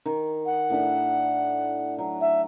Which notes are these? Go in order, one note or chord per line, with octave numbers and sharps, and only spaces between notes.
D#3
F#5
A2 D4 E5
F#3
E5